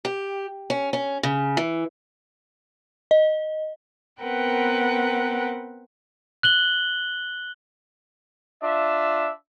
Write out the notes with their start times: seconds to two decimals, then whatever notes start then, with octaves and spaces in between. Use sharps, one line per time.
0.05 G4
0.70 C#4
0.93 C#4
1.23 C#3
1.57 E3
3.11 D#5
4.23 B3 C4 A#4 B4 F#5 G5
6.43 F#6 F#7 G7
8.62 D4 F4 E5